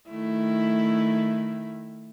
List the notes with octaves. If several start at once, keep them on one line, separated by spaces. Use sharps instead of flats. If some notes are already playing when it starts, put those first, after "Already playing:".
D#3 A3 E4